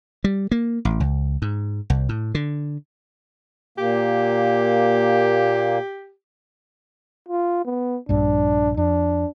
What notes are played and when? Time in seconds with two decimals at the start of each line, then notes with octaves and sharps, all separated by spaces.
0.24 G3
0.51 A#3
0.85 A1
1.00 C#2
1.42 G#2
1.90 C2
2.09 A2
2.35 D3
3.78 A#2 A#3 G4
7.29 F4
7.65 B3
8.09 A#1 G2 D4
8.77 F2 D4